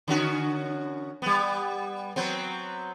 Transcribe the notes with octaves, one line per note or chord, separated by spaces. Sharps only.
D3 C#4 F#4
G3 B3
F#3 B3 C4